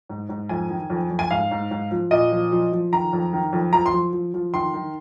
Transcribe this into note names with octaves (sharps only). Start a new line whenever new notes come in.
G#2
G#2
F2 G#5
D#3
F2
F2
G#5
G#2 F5
G#2
G#2
F3
A#2 D#5
F3
F3
F3
D#3 A#5
F2
D#3
F2
F3 A#5
C6
F3
F3
F3
D#3 C6
D#3